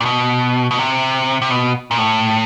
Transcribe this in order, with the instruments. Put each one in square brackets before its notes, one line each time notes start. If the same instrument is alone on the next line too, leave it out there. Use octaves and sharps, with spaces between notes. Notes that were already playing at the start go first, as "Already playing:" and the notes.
[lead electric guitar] A#2
B2
B2
C3
C3
B2
A#2
A2